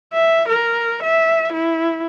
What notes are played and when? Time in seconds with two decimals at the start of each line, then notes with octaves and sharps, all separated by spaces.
0.13 E5
0.48 A#4
1.03 E5
1.53 E4